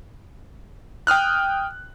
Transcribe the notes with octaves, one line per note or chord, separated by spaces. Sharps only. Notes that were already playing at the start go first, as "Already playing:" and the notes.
G5 D#6 F6 F#6